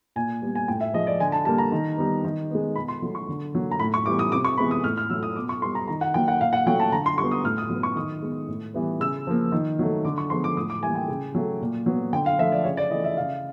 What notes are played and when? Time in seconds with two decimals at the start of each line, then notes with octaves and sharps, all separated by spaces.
0.16 A#2 G#5
0.42 G3 B3
0.55 G#5
0.68 A2 G5
0.81 E5
0.94 F3 G#3 D#5
1.07 D5
1.20 D3 G#5
1.32 A5
1.45 G3 A#3 A5
1.58 A#5
1.72 D#3
1.97 G3 B3
2.25 D#3
2.50 G#3 B3
2.76 B2 B5
2.88 C6
3.02 F#3 A3
3.15 C#6
3.29 D3
3.55 F#3 A#3
3.71 A#5
3.79 A2 B5
3.94 C#6
4.06 E3 G3 B3 D6
4.19 D#6
4.32 C3 D6
4.45 C#6
4.58 E3 G#3 B3 B5
4.71 D#6
4.84 A2 F6
4.97 F6
5.10 F#3 A3 E6
5.23 D#6
5.36 B2 D6
5.49 C#6
5.62 G3 B3 C6
5.75 A#5
5.88 D#3 A#5
6.01 F#5
6.14 F#3 A#3 G5
6.28 F#5
6.41 A#2 F5
6.53 F#5
6.66 F#3 A3 G5
6.80 A5
6.92 D3 A#5
7.06 C6
7.18 G3 C#6
7.23 B3
7.31 D#6
7.44 A2 F6
7.58 D#6
7.70 F#3
7.75 B3
7.83 C#6
7.96 D#3 D#6
8.22 G#3 B3
8.48 A2
8.74 E3 G3 B3
9.00 C#3 E6
9.27 F3 A#3
9.52 D#3
9.79 F#3 A3
10.05 D3 D6
10.18 C#6
10.30 F3 G#3 B3 C6
10.44 D6
10.57 A2 D#6
10.70 D6
10.83 E3 G3 A#3 G#5
10.95 G5
11.08 C#3
11.35 F#3 A3
11.61 A#2
11.86 F#3 B3
12.13 D3 G5
12.26 F5
12.39 F3 A3 E5
12.52 D5
12.64 C#3 C#5
12.77 D5
12.90 E3 D#5
12.93 A3
13.04 E5
13.17 C#3 F5